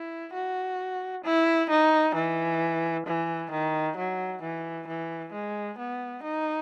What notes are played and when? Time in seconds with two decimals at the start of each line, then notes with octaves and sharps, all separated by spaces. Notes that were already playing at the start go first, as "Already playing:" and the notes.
Already playing: E4
0.33 F#4
1.24 E4
1.70 D#4
2.15 E3
3.06 E3
3.51 D#3
3.97 F#3
4.42 E3
4.87 E3
5.32 G#3
5.78 B3
6.23 D#4